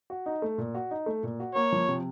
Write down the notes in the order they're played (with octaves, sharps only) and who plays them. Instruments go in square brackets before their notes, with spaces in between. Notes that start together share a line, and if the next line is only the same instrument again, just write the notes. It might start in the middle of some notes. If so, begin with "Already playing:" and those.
[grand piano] F#4
D#4
A3
A#2
F#4
D#4
A3
A#2
F#4
[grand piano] A#3 [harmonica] C#5
[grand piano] F3
C3